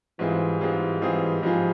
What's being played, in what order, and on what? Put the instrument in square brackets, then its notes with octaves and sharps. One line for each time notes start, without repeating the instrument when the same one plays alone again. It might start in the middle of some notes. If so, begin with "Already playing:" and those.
[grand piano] G#2 G3 C4 F4 G#4 [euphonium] E3
[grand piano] G#2 G3 C4 F4 G#4 [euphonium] E3
[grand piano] G#2 G3 C4 F4 G#4 [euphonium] E3
[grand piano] G#2 G3 C4 F4 G#4 [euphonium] F3